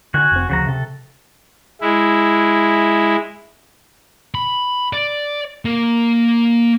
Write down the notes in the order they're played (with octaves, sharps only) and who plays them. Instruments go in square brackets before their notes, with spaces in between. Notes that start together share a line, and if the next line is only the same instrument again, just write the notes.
[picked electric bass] D3 [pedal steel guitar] F#4 F#5 G#5
[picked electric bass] F1 C4
[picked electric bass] D2 F3 [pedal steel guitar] C#3 F#4 A#5
[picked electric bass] C3 [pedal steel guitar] A4
[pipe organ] G#3 E4
[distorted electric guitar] B5
D5
A#3